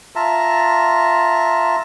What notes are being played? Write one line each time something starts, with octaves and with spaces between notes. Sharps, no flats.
F4 E5 A5 A#5